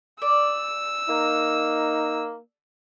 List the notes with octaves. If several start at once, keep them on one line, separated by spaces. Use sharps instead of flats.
D5 E6
A#3 D#4